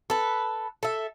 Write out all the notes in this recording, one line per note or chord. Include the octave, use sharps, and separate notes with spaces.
A4 B4
A4 E5